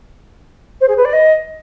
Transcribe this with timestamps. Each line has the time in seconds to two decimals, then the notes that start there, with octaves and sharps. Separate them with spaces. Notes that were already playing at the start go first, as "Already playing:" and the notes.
0.80 C5
0.88 G#4
0.97 B4
1.05 D5
1.13 D#5